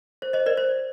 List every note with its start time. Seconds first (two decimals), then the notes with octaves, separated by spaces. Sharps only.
0.22 C5
0.33 C5 D#5
0.46 A#4 D5
0.57 C5